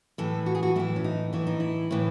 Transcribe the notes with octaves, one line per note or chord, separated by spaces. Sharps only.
A2 E3 A4
F#4
G#4
F#4
A2 E3 E4
C#4
D#4
A2 E3 E4
D#4
E4
A2 E3